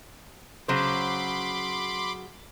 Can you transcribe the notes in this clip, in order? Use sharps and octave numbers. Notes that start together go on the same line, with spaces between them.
C#3 F#3 C5 B5 C6 D6